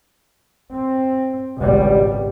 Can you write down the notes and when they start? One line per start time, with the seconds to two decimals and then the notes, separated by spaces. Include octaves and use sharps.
0.72 C4
1.58 G#1 C#2 B2 G3